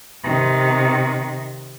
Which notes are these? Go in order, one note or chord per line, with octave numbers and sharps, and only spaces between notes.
C3 D#3